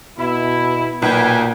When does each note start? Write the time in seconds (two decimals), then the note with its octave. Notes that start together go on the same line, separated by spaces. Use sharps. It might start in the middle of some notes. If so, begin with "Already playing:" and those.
0.19 B2 E4
1.02 B1 A#2 B4 G5 G#5